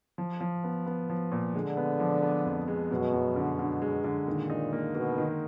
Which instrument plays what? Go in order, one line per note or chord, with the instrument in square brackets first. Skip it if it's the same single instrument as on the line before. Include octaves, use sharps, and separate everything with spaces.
[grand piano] F3
F3
B3
B3
F3
A#2
[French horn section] D3 [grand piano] G#3
[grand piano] B3
F3
B3
F2
G#3
[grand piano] F#2 [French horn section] B2
[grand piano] F#2
D3
D3
G#3
D3
[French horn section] A#2 [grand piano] D#3
[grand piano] D#4
A#3
[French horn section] B2 [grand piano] A#3
[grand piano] D#3